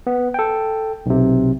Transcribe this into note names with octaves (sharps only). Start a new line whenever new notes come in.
B3
A4 G5
B1 C3